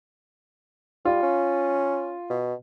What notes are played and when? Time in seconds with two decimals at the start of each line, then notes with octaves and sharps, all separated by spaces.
1.05 G3 F4
1.23 C#4
2.30 B2